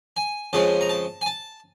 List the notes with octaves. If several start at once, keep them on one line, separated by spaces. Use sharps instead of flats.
G#5
F2 C#3 F3 G#3 A5
A#5
A5
G#5
A5